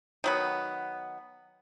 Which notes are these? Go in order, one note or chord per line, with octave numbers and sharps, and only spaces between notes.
D#3 F#3 B3